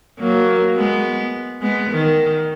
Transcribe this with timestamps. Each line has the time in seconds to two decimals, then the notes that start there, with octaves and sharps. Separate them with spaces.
0.19 F#3 A#3
0.76 G#3 B3
1.61 G#3 B3
1.90 D#3